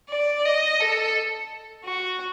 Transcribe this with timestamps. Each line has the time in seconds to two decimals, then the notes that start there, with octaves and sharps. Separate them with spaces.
0.10 D5
0.45 D#5
0.80 A4
1.85 F#4